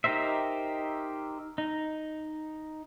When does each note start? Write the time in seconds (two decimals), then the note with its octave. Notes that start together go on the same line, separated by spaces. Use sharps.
0.04 D#4 G4 A#4 C5 E5
1.58 D#4